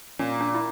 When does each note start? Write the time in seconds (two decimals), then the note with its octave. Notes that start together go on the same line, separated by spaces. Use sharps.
0.19 A#2 C#4
0.41 D4
0.55 E4